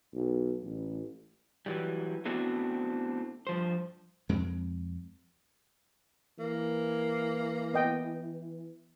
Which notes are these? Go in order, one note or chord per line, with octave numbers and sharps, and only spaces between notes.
B1
A1
E3 F#3 G3
A3 B3 C4 D4 E4 F#4
G2 F3 C5
F2 G#3 C4
E3 A#3
B3 D#5 G5